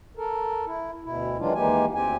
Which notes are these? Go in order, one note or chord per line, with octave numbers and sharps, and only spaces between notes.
A4 A#4
E4
D2 B2 E4
D#3 E3 F#3 G#3 D4 F4
D#2 E3 G#3 A#3 G4 G#5
D2 C4 G4 G#5